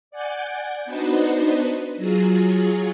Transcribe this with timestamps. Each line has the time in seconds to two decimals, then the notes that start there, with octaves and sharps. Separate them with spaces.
0.11 D5 F#5 G#5 D6 G6
0.85 B3 D4 D#4 F#4 B4 C5
1.97 F#3 F4 F#4 G#4